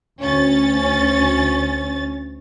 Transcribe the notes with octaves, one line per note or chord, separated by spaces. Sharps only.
D2 C#4 A6